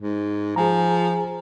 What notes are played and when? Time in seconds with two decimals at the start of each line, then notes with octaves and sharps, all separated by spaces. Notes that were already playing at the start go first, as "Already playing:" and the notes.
0.01 G#2
0.56 F3 G#4 G#5 A#5